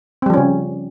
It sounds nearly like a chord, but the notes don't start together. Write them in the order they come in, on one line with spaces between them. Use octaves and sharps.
C4 G3 F3 C#4 C#3